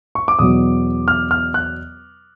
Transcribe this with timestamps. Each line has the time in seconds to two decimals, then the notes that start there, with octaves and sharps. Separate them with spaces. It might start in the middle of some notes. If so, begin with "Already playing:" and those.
0.15 C#6
0.28 D6
0.39 E2 B2 F#3 D#6
1.08 F6
1.31 F6
1.54 F#6